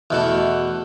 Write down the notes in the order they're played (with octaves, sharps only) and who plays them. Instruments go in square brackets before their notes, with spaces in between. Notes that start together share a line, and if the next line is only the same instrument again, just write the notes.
[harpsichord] E2 B2 A3